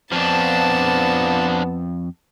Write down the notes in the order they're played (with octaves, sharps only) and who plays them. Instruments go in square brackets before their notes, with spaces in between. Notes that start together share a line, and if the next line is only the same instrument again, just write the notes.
[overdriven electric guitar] F2 [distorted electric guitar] F3 D4 [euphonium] B3 [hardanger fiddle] A5